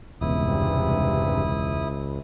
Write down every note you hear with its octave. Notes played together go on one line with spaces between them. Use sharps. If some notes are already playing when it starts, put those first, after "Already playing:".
E1 C#2 G2 C3 B3 E4 D#6